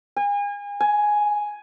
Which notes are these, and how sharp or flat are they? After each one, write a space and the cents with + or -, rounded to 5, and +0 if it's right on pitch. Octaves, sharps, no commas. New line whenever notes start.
G#5 -35
G#5 +5